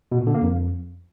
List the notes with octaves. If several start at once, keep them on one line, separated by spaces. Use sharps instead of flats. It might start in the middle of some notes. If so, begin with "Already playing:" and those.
B2
A#2
D3
A#3
F2